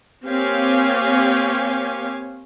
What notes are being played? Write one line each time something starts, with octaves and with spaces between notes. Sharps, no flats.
A#3 C4 G4 C#5 F5 G#5